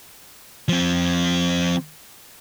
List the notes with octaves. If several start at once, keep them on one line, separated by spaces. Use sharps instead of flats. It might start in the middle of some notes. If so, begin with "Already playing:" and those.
F3 C4